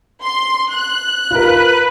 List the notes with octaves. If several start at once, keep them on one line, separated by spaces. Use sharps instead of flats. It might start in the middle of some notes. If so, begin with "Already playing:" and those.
C6
F#6
F4 A#4 B4